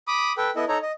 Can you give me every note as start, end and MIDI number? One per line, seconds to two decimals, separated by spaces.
0.08 0.33 83
0.08 0.33 86
0.08 0.33 87
0.37 0.50 69
0.37 0.50 71
0.37 0.50 79
0.56 0.65 59
0.56 0.65 64
0.56 0.65 69
0.56 0.65 75
0.68 0.78 63
0.68 0.78 69
0.68 0.78 73
0.68 0.78 82
0.82 0.92 75